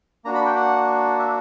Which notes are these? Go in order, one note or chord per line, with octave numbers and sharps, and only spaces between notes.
A#3 D4 F#4 A#5
B5
G5
F#5
E5